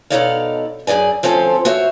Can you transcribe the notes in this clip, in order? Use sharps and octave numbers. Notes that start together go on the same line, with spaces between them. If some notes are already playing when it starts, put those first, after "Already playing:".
B2 D#4 A4 C#5 D5 F5
F#2 C3 G#4 D5 G#5
D2 F3 C4 C#4 A4 G#5
F#4 C5 C#5 E5